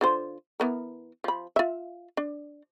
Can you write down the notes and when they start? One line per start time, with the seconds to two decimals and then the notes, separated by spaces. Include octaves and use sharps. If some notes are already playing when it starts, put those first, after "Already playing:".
0.01 D3 F4 C5
0.60 E3 B3 A#4
1.24 F3 B5
1.56 F4 E5
2.17 D4